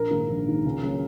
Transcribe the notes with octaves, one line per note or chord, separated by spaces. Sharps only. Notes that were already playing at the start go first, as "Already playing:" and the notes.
Already playing: A#1 A#4
G#2 D#3 A#3
A#1
G#2 D#3 A#3
C#2
C#3 F#3 A#3